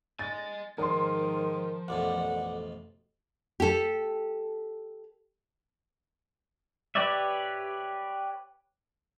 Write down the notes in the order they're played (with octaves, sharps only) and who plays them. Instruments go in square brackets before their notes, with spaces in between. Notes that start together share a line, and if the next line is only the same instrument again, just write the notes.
[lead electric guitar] D#5 G#5 [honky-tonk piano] A6
[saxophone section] G#2 D#3 [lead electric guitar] F3 [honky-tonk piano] A#4 C6
[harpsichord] A1 F2 B2 [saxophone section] D5 F#5
[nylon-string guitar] G4 A4
[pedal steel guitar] G4 B4 C#5 D5 E5